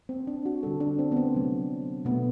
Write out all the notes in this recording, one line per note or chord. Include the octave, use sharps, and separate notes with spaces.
C4
D4
F#4
D3 G3 A4
D4
C4
B3
C4
C3 F#3 A3
B2 A3 B3